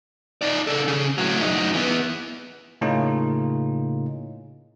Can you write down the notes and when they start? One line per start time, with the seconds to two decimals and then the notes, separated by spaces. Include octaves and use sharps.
0.42 D#4 D5
0.67 C#3 A4
0.88 C#3
1.18 A2 F#3
1.40 F#2 D#4
1.74 E3 B3
2.81 A2 C#3 A#3 C#4 D#4 F4